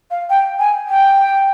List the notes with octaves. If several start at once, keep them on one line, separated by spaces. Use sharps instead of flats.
F5
G5
G#5
G5